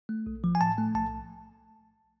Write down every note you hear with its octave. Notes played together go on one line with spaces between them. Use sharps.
A3
B1
F3
G#5
A2 A5
A3
B1 A5